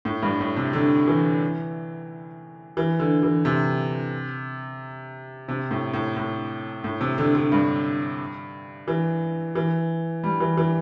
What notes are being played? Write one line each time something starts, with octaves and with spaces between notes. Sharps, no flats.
A2
G2
A2
C3
D3
E3
E3
D3
E3
C3
C3
A2
A2
A2
A2
C3
D3
D3
G2
E3
E3
G3
E3
E3